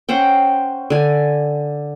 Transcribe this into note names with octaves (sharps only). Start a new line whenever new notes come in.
C#4 C5 F#5 G5
D3 G#5